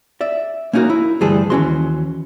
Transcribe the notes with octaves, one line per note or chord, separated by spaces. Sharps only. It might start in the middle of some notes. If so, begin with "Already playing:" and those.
D5 E5
A#3 C#4 D#4 F4 F#4 A#4
E4
D2 G2 E3 G3 G#4 A5
D#2 E3 C#4 E4 F#4 C6